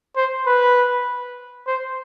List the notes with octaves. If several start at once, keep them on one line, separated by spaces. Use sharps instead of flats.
C5
B4
C5